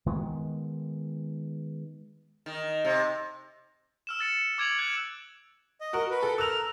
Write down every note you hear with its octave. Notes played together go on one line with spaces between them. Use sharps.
D#3 G#3 B3
D#3
C3
E6 F6 E7
E6 A6 C#7
D6 G#6 D7 F7 F#7
F#6 G#6 D7
D#5
F#4 A#4
B4
A4
A4 A#4 E6 F#6 F7